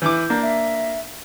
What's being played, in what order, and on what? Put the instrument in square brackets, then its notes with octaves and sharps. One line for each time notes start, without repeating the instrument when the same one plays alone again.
[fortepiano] E3 E4 D6 [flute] G6
[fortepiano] A#3 D4
[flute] E5